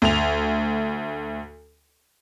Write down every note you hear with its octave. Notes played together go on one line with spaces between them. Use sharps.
D2 F7